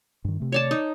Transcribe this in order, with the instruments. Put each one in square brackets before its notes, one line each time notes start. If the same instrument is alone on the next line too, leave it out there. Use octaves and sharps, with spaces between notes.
[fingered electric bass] G2 D#3
C3 A3
[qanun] C#5 D5 A5
D#4